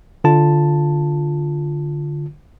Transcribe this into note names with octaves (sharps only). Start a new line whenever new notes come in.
D3 F4 A5